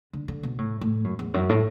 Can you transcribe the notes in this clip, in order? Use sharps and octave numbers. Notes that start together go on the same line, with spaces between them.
D3
D3
B2
A2
A2
F#2
E2
F#2
A2